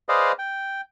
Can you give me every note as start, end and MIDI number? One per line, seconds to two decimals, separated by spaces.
0.09 0.32 68
0.09 0.32 71
0.09 0.32 72
0.09 0.32 74
0.09 0.32 75
0.09 0.32 77
0.39 0.81 79